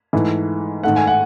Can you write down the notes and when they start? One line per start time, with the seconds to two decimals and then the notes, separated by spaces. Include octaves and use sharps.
0.13 G#2 E3 A3
0.83 G#2 D#3 A3 F#5
0.96 G#5
1.07 F#5